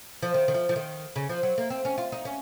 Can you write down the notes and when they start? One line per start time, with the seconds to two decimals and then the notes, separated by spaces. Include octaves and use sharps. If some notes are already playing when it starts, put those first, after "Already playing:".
0.22 F3
0.34 D#3
0.48 D#3
0.54 F3
0.69 F3
0.76 D#3
1.16 C#3
1.29 F3
1.43 F#3
1.58 A#3
1.70 C4
1.85 C#4
1.98 F4
2.12 D#4
2.25 C#4